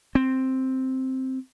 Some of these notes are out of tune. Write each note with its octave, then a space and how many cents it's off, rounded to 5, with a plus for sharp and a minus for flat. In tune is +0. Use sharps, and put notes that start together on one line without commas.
C4 +0